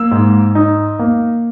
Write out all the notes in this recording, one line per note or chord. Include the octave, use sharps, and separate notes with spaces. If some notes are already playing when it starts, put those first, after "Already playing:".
Already playing: A#3 E6
G#2
D#4
A#3